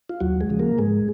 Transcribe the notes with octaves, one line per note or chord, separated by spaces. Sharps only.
F4
D#2 F#3 F#4
G#3 G#4
C#3 F3
A#3 A#4
G#2 G#3 G#4